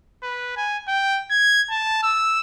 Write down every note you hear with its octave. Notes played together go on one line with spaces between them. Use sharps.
B4
G#5
G5
G#6
A5
E6